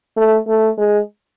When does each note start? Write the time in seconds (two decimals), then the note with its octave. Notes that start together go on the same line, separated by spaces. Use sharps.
0.17 A3
0.48 A3
0.77 G#3